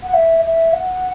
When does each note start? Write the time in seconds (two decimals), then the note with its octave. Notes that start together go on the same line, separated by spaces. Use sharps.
0.03 F#5
0.14 E5
0.43 E5
0.73 F#5